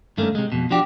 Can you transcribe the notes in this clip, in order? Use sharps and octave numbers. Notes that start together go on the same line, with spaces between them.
G2 D#3 A3 A#3 C#4
C3 G#3
F2 B2
F3 D4 F#4 G4